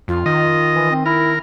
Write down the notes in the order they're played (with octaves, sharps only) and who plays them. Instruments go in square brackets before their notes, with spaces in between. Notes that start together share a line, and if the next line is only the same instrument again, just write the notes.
[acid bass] F2 [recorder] F4
[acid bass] D#3 [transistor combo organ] D#5
[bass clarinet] E3
C4
[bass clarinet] E4 [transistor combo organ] A#4